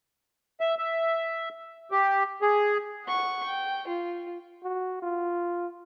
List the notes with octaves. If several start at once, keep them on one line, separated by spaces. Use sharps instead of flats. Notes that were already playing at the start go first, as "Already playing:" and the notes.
E5
E5
G4
G#4
F#5 C#6
G5
F4
F#4
F4